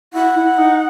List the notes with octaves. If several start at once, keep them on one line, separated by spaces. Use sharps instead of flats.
E4 F#5
E4
D#4